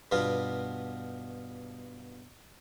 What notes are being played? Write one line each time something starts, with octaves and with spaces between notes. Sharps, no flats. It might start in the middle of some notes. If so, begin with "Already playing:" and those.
G2 B2 B3 F4